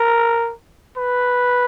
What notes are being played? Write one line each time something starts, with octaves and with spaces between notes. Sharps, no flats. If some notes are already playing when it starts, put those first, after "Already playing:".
Already playing: A#4
B4